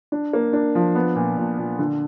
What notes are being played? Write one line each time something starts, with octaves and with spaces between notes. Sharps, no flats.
D4
A#3
D4
F3
B3
A#2
A#2
A#2
D3